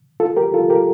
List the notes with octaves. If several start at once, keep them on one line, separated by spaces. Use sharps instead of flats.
F4 A4
G4 A#4
F4 A4
G4 A#4